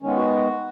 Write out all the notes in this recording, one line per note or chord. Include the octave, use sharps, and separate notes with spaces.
D#3 G#3 B3 C#4
F#4